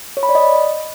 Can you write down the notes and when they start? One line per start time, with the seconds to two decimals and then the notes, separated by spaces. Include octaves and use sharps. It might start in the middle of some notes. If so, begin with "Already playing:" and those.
0.17 C#5
0.23 B5
0.29 D5
0.35 D#5